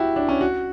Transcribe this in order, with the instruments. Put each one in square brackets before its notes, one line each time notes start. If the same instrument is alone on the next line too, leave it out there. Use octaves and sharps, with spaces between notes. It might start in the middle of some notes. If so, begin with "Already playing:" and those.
Already playing: [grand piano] E4 F#4 G4
D4
C#4
F#4